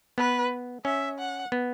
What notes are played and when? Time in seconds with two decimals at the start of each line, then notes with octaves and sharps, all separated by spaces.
0.18 B3 B4
0.85 C#4 E5
1.18 F#5
1.52 B3